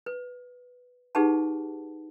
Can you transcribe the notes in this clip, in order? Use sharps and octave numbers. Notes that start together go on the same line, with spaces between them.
B4
D#4 G4 G#4 B4 F#5 A5